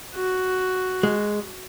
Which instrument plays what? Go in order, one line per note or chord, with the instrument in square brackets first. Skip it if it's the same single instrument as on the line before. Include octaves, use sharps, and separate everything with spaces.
[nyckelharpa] F#4
[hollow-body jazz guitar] G#3